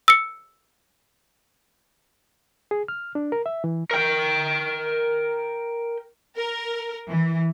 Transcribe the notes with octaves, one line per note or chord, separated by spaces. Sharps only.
E6 C#7
G#4
F6
D4
A#4
E5
E3
A#4 G5
A#4
E3